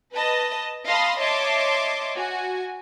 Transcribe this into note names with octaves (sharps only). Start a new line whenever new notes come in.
B4 D#5 A5
D#5 F5 A5 B5 C6 D#6
C#5 D#5 E5 A5 C6 D6
F#4 G#5